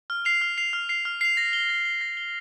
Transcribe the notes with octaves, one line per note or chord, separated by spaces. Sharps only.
F6
C7 F7
F6
C7 F7
F6
C7 F7
F6
C7 F7
A#6
G7
A#6
G7
A#6
G7